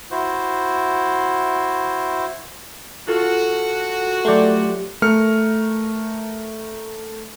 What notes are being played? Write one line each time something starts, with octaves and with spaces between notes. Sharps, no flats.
E4 F#4 C5
F4 F#4 A4 A6
F#3 A3 G4 D5 C6
A3 A#4 F6 C#7